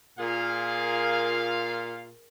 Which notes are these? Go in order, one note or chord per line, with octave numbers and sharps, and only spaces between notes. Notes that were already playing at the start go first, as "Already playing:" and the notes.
A#2 F4 G#4 A#4 F5